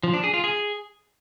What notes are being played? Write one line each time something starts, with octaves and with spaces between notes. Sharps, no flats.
F3
D4
G#4
F4
G#4